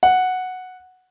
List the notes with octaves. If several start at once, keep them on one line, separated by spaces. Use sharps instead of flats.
F#5